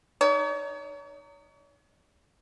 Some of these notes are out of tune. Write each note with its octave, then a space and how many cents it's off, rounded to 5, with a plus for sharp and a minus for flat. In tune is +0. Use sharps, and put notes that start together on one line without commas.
D#4 -15 C#5 +40